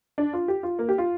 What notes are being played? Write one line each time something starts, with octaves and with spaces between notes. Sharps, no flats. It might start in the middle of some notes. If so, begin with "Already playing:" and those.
D4
F4
G4
F4
A#3
G4
F4